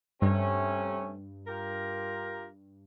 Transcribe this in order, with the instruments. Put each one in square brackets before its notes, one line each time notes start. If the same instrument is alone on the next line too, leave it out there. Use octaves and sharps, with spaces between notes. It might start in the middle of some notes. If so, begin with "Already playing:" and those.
[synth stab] G2 [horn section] C3 A3 C#4
[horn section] F4 G4 A#4